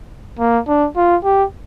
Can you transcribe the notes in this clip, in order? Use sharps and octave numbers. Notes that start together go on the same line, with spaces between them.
A#3
D4
F4
G4